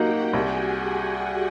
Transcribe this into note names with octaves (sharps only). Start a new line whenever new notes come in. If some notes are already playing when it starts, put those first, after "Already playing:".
Already playing: F#3 A#3 D#4 F#4 G4 F#5 G5
C2 G#4 G#5